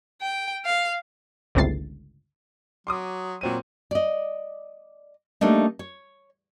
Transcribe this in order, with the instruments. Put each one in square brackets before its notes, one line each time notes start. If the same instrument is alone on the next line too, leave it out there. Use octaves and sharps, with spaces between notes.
[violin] G5
F5
[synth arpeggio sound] G1 C#2 A2 C3 A6 C7
[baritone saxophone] F#3 [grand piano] C6 D6 D#6
[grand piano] A#2 C4 D#7 [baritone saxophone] F#3
[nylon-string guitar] D5 D#5
G3 A3 A#3 D4 D#4
C#5